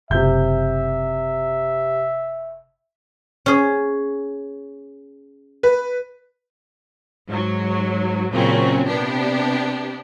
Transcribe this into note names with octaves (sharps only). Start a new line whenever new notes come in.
F#1 C3 E5 G6
C#4 G#4
B4
G#2 F#3
A#2 C#3 F#3 C4 C#4
C3 B3 D4 G4